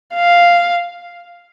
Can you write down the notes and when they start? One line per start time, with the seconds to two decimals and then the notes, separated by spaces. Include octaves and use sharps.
0.15 F5